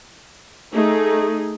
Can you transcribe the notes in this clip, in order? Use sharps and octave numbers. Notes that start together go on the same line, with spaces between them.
A3 D#4 G#4